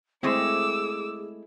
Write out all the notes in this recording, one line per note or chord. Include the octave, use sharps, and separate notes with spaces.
G#3 A3 C4 E4 G#4 D6 E6